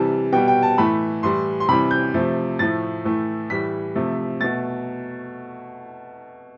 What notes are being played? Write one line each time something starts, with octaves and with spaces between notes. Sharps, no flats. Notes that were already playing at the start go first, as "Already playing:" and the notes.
Already playing: C3 E3 G3 A5
B2 G3 G5
G5
A5
A2 E3 A3 B5
A2 E3 G3 C6
C6
C3 E3 G3 B5
G6
C3 F3 A3
A2 F3 A3 A6
A2 E3 A3
A2 E3 G3 B6
C3 F3 A3
B2 A3 A6